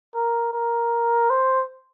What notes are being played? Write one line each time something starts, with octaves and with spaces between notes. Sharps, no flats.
A#4
A#4
C5